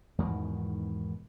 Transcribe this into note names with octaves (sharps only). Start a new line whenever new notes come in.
E2 G#2 B2 D#3